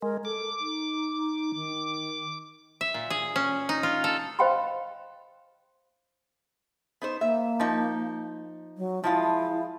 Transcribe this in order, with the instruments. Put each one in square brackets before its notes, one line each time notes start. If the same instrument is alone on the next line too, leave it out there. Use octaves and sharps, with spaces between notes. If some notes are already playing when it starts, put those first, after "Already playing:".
[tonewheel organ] G#3 [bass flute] A#4
[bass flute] A4 [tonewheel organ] D6
[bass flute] D#4
D#3
[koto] E5
A#2
G#4
C#4
D#4
F4
A4
[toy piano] C5 D#5 F5 G5 B5 C6
[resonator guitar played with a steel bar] B3 D#4 C5
[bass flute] A#3 [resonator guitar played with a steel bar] E5
[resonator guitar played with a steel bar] F3 D#4
[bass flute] F#3
[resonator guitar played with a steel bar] F3 G#3 F4 [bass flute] E4